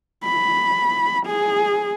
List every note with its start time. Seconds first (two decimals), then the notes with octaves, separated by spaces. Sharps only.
0.24 B5
1.26 G#4